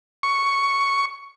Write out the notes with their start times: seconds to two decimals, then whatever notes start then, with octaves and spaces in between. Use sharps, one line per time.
0.23 C#6